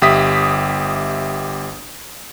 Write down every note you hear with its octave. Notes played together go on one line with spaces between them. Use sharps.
G1 G4 E5 D#6 B6